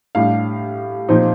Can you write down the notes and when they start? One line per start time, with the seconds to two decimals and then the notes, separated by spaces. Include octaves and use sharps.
0.15 A2 G3 D4 F5
1.09 A#2 F3 C4 D#4